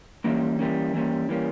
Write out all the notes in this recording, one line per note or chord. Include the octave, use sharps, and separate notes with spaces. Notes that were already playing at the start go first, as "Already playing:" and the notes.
E3 G3 A#3 C#4
E3 G3 A#3 C#4
E3 G3 A#3 C#4
E3 G3 A#3 C#4